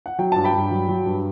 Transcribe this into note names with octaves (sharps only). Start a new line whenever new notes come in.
F#5
F#3 G5
G2 A5
G5 B5
G2
F#3
F#3
G2